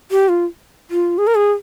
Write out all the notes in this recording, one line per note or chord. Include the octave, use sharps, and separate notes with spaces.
G4
F4
F4
G#4
A#4
G#4